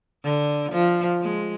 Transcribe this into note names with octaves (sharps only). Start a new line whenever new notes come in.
D3
F3
G#3